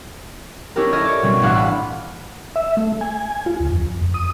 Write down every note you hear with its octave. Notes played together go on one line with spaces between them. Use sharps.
C#4 D4 E4 G4 A#4
A4 A#4 D#5 E5 F6 G#6
C#5 D5
B2 G3 C4 C#4
A1 A2 D4 G#4 F5 F#5
B5
E5
A3
G#5
F4
D2
F2
D#6